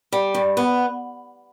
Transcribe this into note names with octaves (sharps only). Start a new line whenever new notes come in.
G3
G2
B3